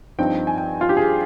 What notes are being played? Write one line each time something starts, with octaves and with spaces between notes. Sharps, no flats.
G2 F3 C4 D#4 G5
G#5
G5
F4
G4
G#4